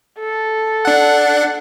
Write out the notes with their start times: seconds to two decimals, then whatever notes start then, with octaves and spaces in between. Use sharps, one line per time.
0.20 A4
0.85 D4 F#5